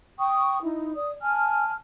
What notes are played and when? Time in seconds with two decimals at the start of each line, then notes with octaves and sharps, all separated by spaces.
0.19 G5 C#6 D#6
0.62 D#4 E4
0.95 D5 D#6
1.21 G#5 A5 F6